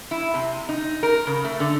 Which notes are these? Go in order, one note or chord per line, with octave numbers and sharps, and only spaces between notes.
E4
C3
D#4
A#4
C#3
A3
D3